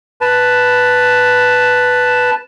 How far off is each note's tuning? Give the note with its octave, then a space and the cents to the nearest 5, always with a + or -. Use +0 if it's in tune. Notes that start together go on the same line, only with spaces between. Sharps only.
B4 +0 A5 +0